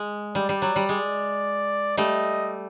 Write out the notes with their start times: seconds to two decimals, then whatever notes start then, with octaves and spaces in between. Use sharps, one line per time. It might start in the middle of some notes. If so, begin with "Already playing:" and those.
Already playing: G#3
0.35 G3 D5
0.49 G3
0.62 F#3
0.76 G3
0.89 G#3
1.97 G3 A3 D#5